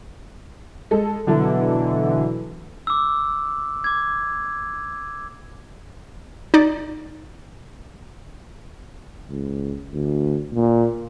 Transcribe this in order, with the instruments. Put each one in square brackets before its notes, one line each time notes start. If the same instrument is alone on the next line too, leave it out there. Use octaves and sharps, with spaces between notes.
[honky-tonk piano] G#3 A4
[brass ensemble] B2 E3 [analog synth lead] D3 [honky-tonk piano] F#3 E4 A4
[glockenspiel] D6 E6
D6 G#6
[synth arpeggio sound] D#4 D5
[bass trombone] C#2
D2
A#2